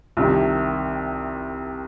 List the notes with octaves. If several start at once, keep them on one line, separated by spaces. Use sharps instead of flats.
C2 C3 D#3